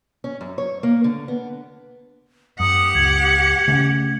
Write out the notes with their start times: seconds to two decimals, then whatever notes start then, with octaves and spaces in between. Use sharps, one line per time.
0.24 C#4
0.41 F#2
0.58 C#5
0.83 A#3
1.04 D3
1.28 B3
2.60 F#2 G4 F#5 D#6
2.95 C#2 G#6
3.68 C#3 A3 C#4